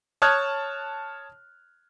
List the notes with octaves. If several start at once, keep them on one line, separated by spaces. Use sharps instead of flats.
C#5 A5 D#6 F6 F#6 G#6